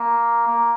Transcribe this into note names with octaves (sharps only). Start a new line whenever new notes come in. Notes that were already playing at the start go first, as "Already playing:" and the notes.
Already playing: A#3
A#3